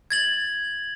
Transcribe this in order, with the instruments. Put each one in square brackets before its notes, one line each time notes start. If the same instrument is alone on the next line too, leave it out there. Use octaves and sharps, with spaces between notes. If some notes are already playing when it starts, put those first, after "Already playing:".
[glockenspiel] G#6 A6 F#7